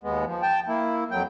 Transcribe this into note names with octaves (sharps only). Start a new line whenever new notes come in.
D#2 G#3 B3
F3
G5 A5
A#3 E4
F2 F#3 G5